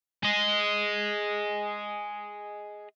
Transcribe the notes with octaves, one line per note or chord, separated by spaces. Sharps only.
G#4 D#5